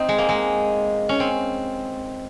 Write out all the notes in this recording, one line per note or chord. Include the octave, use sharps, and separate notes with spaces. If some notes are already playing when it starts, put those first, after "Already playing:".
Already playing: C4 D#4
G#3
A#3
G#3
C#4
C4